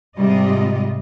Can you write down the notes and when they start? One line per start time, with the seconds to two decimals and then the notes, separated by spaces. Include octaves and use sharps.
0.17 G#2 C3 G3 F4 D#5